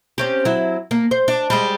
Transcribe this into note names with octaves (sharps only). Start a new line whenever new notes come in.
C4 C#4 G4
F#3 E4
A#3
C5
D4
G3 G#3